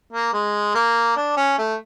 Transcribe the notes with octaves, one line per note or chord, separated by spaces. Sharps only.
A#3
G#3
A#3
D4
C#4
A3